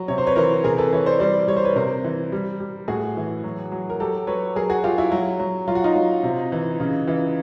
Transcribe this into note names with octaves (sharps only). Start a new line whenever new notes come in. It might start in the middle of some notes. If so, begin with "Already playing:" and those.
Already playing: F#3
C3 C#5
C5
B4 C#5
E3 A#4 C5
C3 G#4 A#4
A4 B4
E3 B4 C#5
C5 D5
G3 C5 D5
G3 C#5
C5
B4 C#5
C3 A#4 C5
E3
G3
G3
A2 F#4 G#4
E3
F#3
F#3
A#4
F#3 G4 A4
F#3 B4 C#5
F#3 G#4 A#4
F#4 G#4
F#3 F4 G4
E4 F#4
F#3
F#3
F#3 F4
F#4
D#4 F4
F#3
C3
E3
C#3
E3